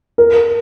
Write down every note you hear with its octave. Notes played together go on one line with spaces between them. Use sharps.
A#4